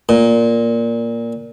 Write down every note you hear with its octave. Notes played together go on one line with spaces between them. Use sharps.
A#2